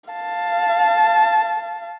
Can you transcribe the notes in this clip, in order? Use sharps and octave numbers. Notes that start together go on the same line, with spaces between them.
F5 A5